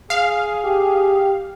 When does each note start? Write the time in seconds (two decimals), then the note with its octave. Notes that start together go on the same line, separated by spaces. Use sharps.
0.10 G#4 F5
0.64 G4